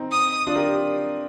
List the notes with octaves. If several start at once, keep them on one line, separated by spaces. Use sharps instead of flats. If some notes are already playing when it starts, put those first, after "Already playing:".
Already playing: C4 D#4
D#6
D4 F4
G4 A#4